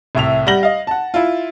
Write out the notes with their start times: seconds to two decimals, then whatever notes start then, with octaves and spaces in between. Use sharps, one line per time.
0.15 C2 A2 E5 F7
0.47 G3 F#5 A#6 F#7 G7
0.63 D#5 F5
0.87 F#5 A5
1.14 E4 F4